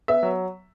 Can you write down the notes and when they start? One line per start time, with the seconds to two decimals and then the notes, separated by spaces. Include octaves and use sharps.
0.08 B3 E5
0.23 F#3